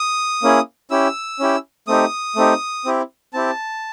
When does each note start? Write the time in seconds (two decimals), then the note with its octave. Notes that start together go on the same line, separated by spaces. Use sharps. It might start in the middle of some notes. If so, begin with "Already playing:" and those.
Already playing: D#6
0.43 A#3 C#4 E4 G#4
0.91 C#4 E4 G4 E6
1.39 C#4 E4 G4
1.87 A3 C4 D#4 G4 D#6
2.36 A3 C4 D#4 G4
2.85 C4 E4 G4
3.33 C4 E4 G4 A5